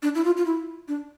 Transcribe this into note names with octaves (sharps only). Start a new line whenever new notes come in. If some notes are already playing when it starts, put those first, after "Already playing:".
D4
E4
F4
F4
E4
D4